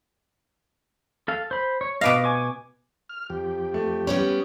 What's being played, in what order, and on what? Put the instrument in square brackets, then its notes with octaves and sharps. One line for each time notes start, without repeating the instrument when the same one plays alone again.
[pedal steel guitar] A4 F5
C5 B5
C#5
[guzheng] B2 B4 F5 [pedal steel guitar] D#5 D6
[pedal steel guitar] G#5 C#6 D6
[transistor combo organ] F6
F2 G4
[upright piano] A3
[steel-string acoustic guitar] G3 B3 C#4 [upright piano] C#5